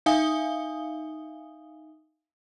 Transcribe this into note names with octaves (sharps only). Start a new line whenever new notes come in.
D#4 E5 F5 G#5 D#6 G7